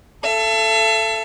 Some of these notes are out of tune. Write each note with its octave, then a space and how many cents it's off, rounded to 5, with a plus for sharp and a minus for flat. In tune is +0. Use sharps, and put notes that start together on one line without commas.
A4 +0 E5 +40